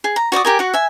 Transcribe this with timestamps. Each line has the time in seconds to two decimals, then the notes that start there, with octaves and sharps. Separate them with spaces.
0.04 G#4
0.16 A#5
0.32 F#4 D5 C#6 D#6
0.45 G4 A#4 G#5
0.59 F#4 F#5
0.74 E5 G#5